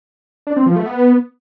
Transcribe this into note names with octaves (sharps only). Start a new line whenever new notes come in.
D4
C4
F3
A3
B3